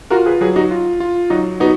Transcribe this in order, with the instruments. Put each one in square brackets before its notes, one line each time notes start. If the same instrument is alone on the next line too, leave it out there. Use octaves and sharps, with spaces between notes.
[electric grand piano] F4 [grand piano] F#4 A#4
[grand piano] G#4 B4
[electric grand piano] F#3 [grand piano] G#4 B4
[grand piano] D#4 F#4
[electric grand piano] F4
F4
[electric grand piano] F#3 [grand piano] D#4 F#4
[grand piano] B3 D#4 [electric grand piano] F#4